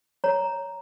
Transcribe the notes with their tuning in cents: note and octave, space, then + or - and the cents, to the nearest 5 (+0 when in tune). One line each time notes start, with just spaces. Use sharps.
C#5 +0 A#5 +0